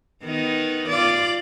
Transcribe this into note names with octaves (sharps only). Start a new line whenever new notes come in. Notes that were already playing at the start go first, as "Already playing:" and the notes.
D#3 B3 D#4
F4 D5